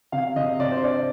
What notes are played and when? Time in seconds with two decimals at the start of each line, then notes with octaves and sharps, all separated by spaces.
0.12 C3 F5
0.36 C3 D#5
0.60 C3 D5
0.71 C5
0.83 D4 D5